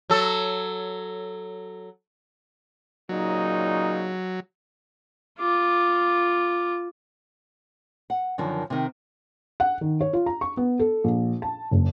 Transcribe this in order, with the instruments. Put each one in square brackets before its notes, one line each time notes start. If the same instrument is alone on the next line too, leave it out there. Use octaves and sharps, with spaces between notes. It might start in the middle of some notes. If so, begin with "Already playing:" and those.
[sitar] F#3 A4
[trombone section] A#2 C#3 D#4 [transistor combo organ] F#3
[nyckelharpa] F4 D6
[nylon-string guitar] F#5
F#2 D3 D#3 F3
C3 D#3
[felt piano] F#5
D#3
C#5
F4
A#5
C#6
B3
A4
A#1
A5
F#1